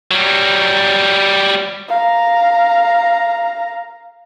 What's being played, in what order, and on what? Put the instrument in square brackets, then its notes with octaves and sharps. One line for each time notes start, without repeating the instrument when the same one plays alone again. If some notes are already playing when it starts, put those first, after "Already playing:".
[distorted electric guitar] F#3 G3
[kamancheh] F5 A#5